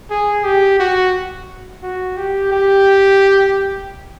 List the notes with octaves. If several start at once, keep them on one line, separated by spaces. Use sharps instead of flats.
G#4
G4
F#4
F#4
G4
G4